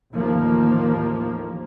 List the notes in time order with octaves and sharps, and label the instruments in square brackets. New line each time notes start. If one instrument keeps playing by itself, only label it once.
[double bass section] A1 D#2 A2 D#3 F3 A#3